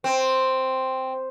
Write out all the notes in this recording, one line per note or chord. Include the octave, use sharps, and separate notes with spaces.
C4